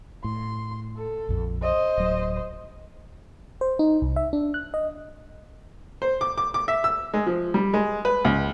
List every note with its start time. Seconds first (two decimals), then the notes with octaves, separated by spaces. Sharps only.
0.24 A2 C6
0.98 A4
1.29 A#1 F2
1.62 C5 D#5
1.98 D1 F#3
3.61 C5
3.79 D#4
4.02 C2
4.16 E5
4.33 D4
4.54 F#6
4.74 D#5
6.02 C5
6.21 D6
6.38 D6
6.54 D6
6.68 E5
6.84 E6
7.14 G#3
7.27 F3
7.54 G3
7.74 G#3
8.05 B4
8.25 C#2